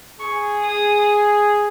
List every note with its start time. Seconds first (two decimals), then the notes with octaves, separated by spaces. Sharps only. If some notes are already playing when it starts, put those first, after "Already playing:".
0.19 G#4 C#6
0.63 D#6